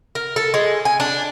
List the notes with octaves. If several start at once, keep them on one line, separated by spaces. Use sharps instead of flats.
A#4
A4
G#3
G#5
D4